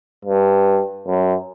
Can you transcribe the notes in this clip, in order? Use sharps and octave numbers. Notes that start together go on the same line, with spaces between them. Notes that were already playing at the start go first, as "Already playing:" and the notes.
G2
F#2